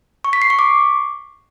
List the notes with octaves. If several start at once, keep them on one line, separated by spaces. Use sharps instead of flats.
C#6
B6
C7
C#6
D6